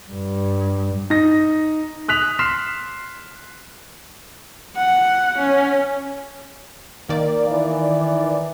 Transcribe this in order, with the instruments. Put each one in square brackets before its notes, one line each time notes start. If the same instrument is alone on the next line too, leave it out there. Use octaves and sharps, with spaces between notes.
[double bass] G2
[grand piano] D#4 A#6
D#6 F#6 B6 F7
C6 F6 B6 C7 E7
[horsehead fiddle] F#5
C#4
[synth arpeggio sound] D#3 D5 [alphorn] A#3
[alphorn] E3